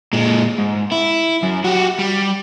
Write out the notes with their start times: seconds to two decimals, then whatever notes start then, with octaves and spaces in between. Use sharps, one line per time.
0.13 A#2 G#3
0.58 G#2
0.92 E4
1.43 F#2
1.65 F#4 G4
1.99 G3